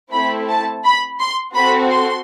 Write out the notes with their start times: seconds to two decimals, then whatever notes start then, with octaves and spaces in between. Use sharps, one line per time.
0.12 A3 C4 E4 A4 B5
0.48 A5
0.84 B5
1.20 C6
1.55 C4 F#4 A4 B5
1.91 C6